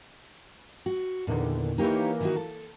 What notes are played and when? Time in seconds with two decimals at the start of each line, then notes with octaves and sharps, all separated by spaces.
0.86 F#4
1.27 E2 A#2 D3 D#3
1.78 E3 A#3 D#4 G4 C#5
2.21 D#3 D#4 F#4
2.36 A4